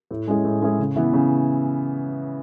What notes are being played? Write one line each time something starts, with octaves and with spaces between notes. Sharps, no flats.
A2
G#3 C#4 E4 G#4
A2
G#3 C#4 E4 G#4
C#3
E3 B3 E4
C#3